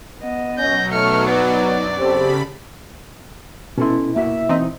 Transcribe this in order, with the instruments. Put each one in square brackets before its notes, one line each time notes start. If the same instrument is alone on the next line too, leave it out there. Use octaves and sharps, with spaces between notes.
[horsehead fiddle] B3 D#5
[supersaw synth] B2 F#3 [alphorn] C#4 [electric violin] G6 A#6
[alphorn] A3 [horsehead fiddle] D#4 [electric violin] F6 C#7
[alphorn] B3 [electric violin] D5
[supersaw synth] F#2
[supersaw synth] C#3 B5 [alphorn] C4 [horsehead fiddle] G4 A4
[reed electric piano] B2 E4 [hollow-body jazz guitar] C#4 A4 C6
[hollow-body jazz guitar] A#3 F#4 [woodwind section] E5
[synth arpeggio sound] E3 C4 D#4